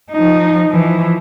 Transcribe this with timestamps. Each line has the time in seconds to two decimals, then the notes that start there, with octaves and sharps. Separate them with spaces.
0.11 F3 D#4
0.69 E3 F3